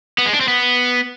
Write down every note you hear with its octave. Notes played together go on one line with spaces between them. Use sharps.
B3
G#3
D4
C4
B3